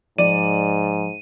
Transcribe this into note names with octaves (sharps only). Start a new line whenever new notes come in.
G#2 F3 D5 D#7